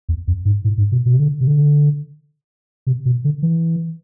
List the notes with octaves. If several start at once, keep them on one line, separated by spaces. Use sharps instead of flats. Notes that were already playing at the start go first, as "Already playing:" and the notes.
E2
F2
G#2
A2
G#2
B2
B2
C3
D3
C3
D3
C3
B2
D3
E3